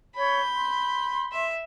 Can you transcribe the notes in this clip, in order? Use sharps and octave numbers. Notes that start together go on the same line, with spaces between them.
C#5 B5 G6
C6
E5